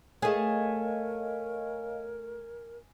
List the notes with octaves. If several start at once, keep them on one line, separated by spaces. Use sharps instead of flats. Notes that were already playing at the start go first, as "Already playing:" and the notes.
A3 G#4 A#4 C#5 D#5 F5 G#5